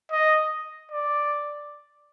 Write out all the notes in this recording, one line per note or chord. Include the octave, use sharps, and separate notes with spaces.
D#5
D5